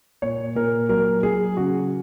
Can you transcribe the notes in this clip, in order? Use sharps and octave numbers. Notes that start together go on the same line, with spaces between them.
A#2 C#5
A#2 A#4
F#3 A#4
F#3 G#4
C#3 F#4